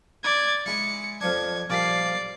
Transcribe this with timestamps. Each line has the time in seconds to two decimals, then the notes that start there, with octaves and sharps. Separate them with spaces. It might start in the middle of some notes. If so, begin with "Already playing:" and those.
0.23 D5 G#6
0.66 G#3 E4 C#7
1.21 F2 F3 D4 G#6
1.70 A#2 F3 G3 D5 C7